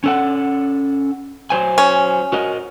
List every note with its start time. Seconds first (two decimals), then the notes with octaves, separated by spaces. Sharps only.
0.04 C#4 A4 F#5
1.50 F#3 C5 G#5
1.78 C#4
2.33 F#4 A#4 D#5